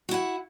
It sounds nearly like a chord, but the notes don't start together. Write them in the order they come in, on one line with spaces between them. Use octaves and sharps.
F#4 E4 F#5